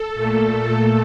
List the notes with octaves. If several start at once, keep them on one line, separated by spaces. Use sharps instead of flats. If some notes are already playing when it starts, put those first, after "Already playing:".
Already playing: A4
A#2 A3